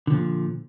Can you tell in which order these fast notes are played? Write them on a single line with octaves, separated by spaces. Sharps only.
D3 F3 A#2